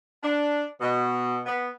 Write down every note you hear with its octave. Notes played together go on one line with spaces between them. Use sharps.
D4
B2
B3